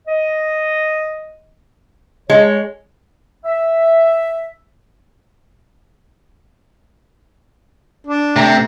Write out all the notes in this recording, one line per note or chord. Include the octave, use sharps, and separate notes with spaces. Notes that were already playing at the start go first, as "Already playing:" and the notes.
D#5
G#3 C#5
E5
D4
C3 A3 C4 A#5